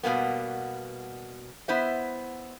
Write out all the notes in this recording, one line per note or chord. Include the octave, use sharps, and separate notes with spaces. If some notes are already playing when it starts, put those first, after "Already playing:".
B2 G3 A#3 B3
B3 E4 C5 E5